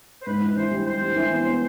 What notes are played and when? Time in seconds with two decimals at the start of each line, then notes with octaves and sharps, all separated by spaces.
0.22 C5
0.26 G#2 B4
0.42 E3
0.56 E3 C5
0.71 G3
0.87 E3 C5
1.01 G3
1.16 E3
1.32 B3
1.47 B3